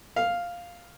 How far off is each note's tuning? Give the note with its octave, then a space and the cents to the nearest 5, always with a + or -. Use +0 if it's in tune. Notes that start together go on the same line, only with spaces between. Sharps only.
F5 +0